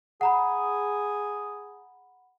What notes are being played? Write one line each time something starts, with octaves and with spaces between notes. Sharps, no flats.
G#4 F#5 A#5 B5